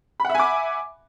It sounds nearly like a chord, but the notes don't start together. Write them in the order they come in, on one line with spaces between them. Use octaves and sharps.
B5 F#5 E5 G#5 D6